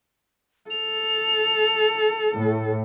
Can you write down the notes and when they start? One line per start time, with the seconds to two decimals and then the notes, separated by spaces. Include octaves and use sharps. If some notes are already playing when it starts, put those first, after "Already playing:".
0.70 A4 F7
2.34 A2